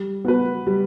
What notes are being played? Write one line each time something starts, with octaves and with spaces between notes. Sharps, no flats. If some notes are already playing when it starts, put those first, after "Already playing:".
Already playing: G3
B3 F#4 B4
G3